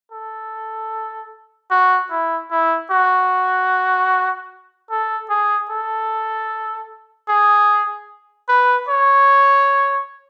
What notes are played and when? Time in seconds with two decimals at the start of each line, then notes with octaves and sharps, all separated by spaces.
0.12 A4
1.71 F#4
2.11 E4
2.51 E4
2.91 F#4
4.91 A4
5.30 G#4
5.71 A4
7.29 G#4
8.49 B4
8.89 C#5